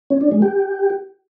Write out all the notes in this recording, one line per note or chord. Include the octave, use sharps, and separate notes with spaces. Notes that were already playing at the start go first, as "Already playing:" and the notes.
C#4
D4
G#3
G4